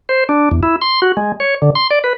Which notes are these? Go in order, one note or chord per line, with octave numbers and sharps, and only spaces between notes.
C5
D4
E2
E4
C6
F#4
G#3
C#5
D3
C6
D5
B4